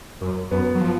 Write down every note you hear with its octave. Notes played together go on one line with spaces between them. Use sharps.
F#2
F#2 B3
F#3
F3